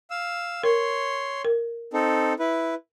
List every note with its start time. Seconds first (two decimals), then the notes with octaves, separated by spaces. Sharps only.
0.11 F5 E6
0.64 A#4 C#5 C6
1.45 A#4
1.93 C4 D#4 A4
2.39 E4 B4